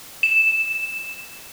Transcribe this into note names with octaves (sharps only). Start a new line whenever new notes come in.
E7